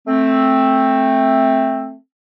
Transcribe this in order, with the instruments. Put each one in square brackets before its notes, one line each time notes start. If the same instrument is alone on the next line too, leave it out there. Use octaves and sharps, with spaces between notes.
[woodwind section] A3 C4